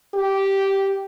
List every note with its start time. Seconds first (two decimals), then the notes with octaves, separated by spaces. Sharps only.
0.14 G4